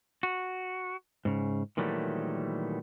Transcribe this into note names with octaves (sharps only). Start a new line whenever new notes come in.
F#4
G#2 C#3
A#2 D#3 E3 F#3 G3 A3